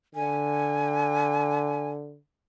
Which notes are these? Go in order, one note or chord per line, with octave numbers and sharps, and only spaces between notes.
D3 G#5